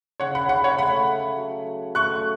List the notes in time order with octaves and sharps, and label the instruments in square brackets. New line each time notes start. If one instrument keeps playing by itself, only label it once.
[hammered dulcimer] C#3 [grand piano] C#5 F#5
[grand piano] F#5 B5
[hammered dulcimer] C#3 [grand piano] F#5 B5
[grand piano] C#5 F#5
[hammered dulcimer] A3 [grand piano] F#5 B5
[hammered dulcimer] A3
F#3
C#5
[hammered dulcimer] A3 [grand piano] C#6 F#6